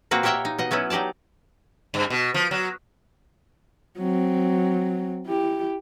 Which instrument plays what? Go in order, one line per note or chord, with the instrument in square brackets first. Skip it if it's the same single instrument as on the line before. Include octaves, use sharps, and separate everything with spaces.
[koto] A#2 A#3 C4 F#4 B4
G4 A#4 C#5 E5 F#5 G5
D#4
B2 D#5 F#5
F#3 B3 C#4 E4
F#3 D#4 G4 D5 A5
[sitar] G2
B2
F3
F#3
[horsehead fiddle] F#3 C4
E4 G4